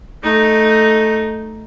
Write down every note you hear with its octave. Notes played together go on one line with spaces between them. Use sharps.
A3 D#4